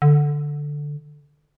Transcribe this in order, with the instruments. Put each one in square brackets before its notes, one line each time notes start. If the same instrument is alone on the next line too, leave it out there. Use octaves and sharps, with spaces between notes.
[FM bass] D3